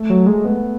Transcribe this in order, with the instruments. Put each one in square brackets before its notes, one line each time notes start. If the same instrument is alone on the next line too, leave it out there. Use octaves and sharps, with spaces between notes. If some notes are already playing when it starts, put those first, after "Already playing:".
Already playing: [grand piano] A3
[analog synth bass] F#3
G#3
[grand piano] B3